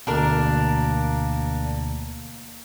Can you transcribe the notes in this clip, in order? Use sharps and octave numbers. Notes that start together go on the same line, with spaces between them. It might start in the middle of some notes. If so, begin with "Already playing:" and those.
D2 B2 A#3 D4 A#4